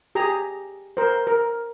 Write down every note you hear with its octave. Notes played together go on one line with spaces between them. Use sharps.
G4 G#4 A#5
A#4 C5
A#4